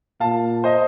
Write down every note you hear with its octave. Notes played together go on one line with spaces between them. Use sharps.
A#2 F5 A5
C5 D#5